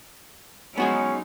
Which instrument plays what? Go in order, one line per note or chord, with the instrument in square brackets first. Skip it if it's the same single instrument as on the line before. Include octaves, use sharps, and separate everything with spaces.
[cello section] F#3 G#3 D#4 [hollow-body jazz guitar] B3 F#4 G#4 [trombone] C#4